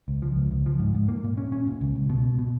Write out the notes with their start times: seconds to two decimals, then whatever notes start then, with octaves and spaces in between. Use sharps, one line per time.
0.08 C#2
0.22 F3
0.36 C#2
0.51 C#2
0.66 F3
0.79 G#2
0.95 G#2
1.08 A#3
1.24 A#2
1.37 C#4
1.52 C#4
1.67 A#2
1.81 C#2
1.95 C#2
2.09 B2
2.24 B2
2.39 B2